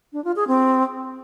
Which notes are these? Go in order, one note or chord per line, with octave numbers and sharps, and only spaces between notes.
D4
F4
G#4
C4